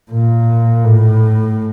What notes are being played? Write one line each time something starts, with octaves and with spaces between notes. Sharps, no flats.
A#2
A2